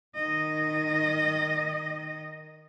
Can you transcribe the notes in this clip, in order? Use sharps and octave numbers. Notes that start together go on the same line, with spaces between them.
D#3 D#5